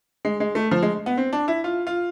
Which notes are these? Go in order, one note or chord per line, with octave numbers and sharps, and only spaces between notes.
G#3
G#3
A3
F3
G#3
B3
C4
D4
E4
F4
F4